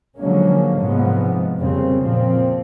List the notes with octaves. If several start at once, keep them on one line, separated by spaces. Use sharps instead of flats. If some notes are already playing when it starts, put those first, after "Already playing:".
D3 F3 F#3 G#3 A#3 C#4
G#2 C3 F3 G#3 B3
F2 A#2 C#3 G3 C4
A#2 F3 C4